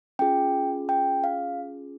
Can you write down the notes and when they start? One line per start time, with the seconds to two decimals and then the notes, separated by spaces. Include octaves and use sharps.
0.19 C#4 F4 G#4 G5
0.89 G5
1.24 F5